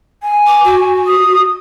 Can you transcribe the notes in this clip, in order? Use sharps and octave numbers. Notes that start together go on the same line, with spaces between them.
G#5
D6
F#4
D#6